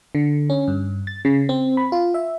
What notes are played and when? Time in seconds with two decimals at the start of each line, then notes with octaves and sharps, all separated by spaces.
0.15 D3
0.50 C#4
0.68 G2
1.07 A6
1.25 C#3
1.49 C4
1.77 B5
1.92 F4
2.14 E5